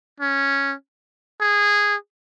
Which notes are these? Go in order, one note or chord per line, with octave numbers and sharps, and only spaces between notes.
C#4
G#4